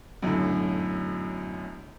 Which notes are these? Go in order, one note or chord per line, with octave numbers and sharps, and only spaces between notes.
B1 F#2 A2 D3